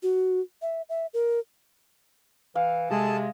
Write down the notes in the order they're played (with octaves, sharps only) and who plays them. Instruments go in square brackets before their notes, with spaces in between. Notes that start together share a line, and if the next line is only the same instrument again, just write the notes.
[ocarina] F#4
E5
E5
A#4
[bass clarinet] E3 [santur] F5
[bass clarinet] C3 [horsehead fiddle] G#3 [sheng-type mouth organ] G#4 A4 A5